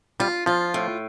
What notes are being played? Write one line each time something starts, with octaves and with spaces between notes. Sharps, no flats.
G3 F4
F3 F4
A2